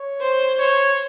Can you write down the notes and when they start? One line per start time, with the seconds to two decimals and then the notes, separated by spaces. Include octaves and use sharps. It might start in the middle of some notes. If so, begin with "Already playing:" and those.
Already playing: C#5
0.20 C5
0.59 C#5